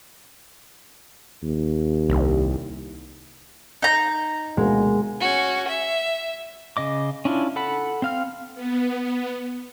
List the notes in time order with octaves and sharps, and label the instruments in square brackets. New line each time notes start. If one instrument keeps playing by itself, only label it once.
[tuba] D#2
[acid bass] C2
[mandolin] D#4 A#5 [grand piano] G6
[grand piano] D2 B2 A#3 [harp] G#3
[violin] C#4 F#4
E5
[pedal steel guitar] C#3 D#5 D6
C#4 D4 E4 F4
A4 F#5 B5
C4 F5 F6
[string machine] B3